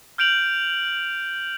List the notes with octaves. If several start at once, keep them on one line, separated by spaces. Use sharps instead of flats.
F6 G6 D7 F7 F#7